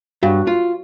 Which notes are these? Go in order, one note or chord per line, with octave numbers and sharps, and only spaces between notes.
G2 F#4
F4